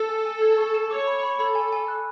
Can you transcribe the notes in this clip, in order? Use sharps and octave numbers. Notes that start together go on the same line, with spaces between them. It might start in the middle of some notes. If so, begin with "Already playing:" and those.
Already playing: A4
G#5
G#5
G#6
C#6
E7
C#5 D6
B5
B5
A4 B5
G#5
G#5
F#6